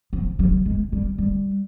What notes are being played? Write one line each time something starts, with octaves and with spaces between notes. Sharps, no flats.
F3
F#3
G#3
G3
G3